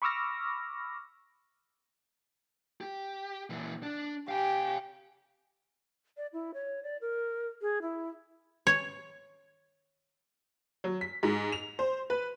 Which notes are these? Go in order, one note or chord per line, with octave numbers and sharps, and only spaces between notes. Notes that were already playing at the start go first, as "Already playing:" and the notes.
B5 C#6 D6 E6 F6 A#6
G4
A#2 E3
D4
G4 F5 G#5
D5
E4
C#5
D5
A#4
G#4
E4
C#5
F#3
B6
G#2
F7
C5
B4